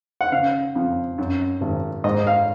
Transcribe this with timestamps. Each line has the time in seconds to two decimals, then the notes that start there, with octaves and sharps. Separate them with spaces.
0.21 F#5
0.32 C#3 F5
0.76 F2
1.18 F#2
1.61 G#1
2.04 G#2 D#5
2.27 F5